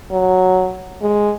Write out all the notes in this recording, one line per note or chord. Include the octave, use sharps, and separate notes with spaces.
F#3
G#3